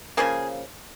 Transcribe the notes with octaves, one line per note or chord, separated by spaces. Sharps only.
C#3 F3 A#3 G#4